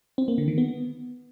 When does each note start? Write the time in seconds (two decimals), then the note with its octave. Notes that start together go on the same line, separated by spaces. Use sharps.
0.18 C4
0.28 A#3
0.38 D3
0.48 D#3
0.58 B3